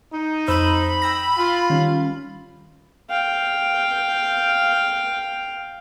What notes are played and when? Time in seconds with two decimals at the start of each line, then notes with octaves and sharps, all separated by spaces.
0.13 D#4
0.48 F2 C5 B5 E6
1.02 G5 E6 A#6
1.38 F4
1.70 D#3 G3 C#4
3.10 F5 G5